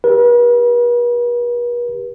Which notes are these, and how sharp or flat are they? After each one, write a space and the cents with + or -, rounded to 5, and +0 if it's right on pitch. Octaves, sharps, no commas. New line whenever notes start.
G4 +10 B4 -45